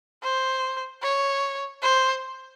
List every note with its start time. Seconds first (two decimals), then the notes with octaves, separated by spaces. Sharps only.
0.23 C5
1.03 C#5
1.83 C5